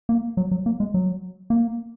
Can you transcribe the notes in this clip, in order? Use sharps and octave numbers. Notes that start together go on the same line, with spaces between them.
A#3
F#3
F#3
A#3
G#3
F#3
A#3